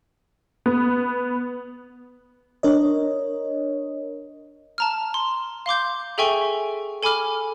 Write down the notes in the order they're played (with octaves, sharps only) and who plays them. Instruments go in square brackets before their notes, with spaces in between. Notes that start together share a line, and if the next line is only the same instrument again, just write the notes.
[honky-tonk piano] B3
[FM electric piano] D4 A#4 C#5 D#5
[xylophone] A5 A#5 F6
C6
F5 C6 D6 G6
G#4 A4 E5 G5 G#5 C#6
A4 G#5 B5 D6 F6